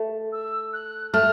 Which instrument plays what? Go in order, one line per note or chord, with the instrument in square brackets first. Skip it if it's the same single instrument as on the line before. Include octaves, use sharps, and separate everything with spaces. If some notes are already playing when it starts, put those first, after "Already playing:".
Already playing: [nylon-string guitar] A3
[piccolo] E6
F#6
[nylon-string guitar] A3 [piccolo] F6